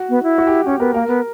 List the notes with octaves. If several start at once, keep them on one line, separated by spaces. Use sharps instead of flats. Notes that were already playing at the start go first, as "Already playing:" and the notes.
Already playing: F#4
B3
E4
F#4
G4
C#4 G4
B3 A#4
A#3 A#4
B3